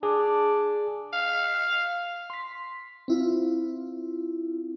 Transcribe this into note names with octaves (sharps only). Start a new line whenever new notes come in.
D4 G#4
F5
C6 B6
C4 E4 F4